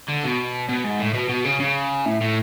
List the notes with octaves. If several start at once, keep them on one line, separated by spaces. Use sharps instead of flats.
D3
B2
B2
G#2
A2
B2
B2
C#3
C#3
A2
A2